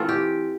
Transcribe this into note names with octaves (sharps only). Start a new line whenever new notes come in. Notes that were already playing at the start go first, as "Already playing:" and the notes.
Already playing: E3 A3 C4 F4
G4